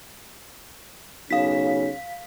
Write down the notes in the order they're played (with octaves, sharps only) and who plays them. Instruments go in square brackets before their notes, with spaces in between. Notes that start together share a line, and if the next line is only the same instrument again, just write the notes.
[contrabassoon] B1 [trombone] C#3 [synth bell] F5 B6